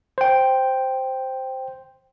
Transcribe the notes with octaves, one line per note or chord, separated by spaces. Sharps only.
C5 G5